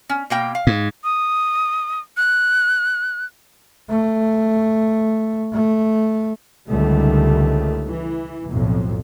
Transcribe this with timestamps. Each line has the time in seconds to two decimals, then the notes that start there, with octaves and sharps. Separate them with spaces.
0.09 C#4
0.30 B2 A#3 G5
0.55 F5
0.67 G#2
1.04 D#6
2.17 F#6
3.90 A3
5.52 A3
6.67 C#2 D3 D#3 G3 A3
7.86 E3
8.51 B1 F2 A2